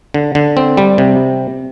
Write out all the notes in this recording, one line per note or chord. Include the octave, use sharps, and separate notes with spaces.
D3
D3
C4
G3
C3